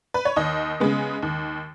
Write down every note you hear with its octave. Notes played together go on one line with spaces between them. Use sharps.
B4
C#5
D#2 D#5
C#3 G#3 B3
D#2